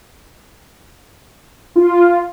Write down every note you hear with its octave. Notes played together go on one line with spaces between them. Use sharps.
F4